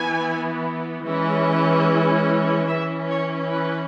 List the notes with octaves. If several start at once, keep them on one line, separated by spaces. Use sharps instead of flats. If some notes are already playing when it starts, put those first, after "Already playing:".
Already playing: E3 B3 G#5
E3 G#3 C#4
E3 C#4 E5
C#5
B4